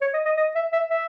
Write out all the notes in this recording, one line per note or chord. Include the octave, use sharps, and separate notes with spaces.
C#5
D#5
D#5
D#5
E5
E5
E5